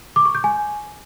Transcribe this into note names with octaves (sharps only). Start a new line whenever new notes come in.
D6
C#6
G6
G#5